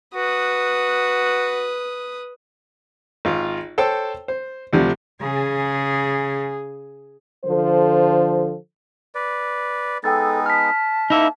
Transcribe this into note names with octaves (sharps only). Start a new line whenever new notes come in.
F#4 B4 D#6
G#1 F4
A4 C5 C#5 G5 A5 E6
C5
D2 C3 F3 G3
C#3 G#4
D3 F3 A4 C5
B4 D5
G#3 B3 D#4 A4 G5 E6 A6
A5 F6 B6
A#3 D#4 E4 E5